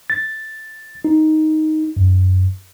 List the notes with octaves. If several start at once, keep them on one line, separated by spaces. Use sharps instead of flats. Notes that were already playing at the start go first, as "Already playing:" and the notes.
A6
D#4
F#2